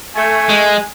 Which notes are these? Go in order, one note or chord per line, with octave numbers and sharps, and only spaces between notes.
A3 G#5
G#3